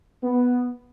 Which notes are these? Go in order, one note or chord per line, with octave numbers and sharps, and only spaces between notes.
B3